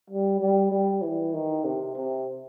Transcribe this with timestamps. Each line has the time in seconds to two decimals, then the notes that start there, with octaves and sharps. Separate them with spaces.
0.10 G3
0.40 G3
0.72 G3
1.02 E3
1.34 D#3
1.64 C3
1.96 C3